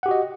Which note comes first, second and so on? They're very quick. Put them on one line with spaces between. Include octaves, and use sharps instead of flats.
F#5 G4 F#4 D#5